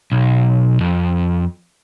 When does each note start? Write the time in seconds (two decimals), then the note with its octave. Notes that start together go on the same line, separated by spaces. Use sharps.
0.12 B1
0.81 F2